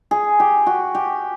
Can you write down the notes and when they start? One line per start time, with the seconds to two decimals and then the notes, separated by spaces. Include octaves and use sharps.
0.11 G#4
0.40 G4
0.66 F#4
0.95 G4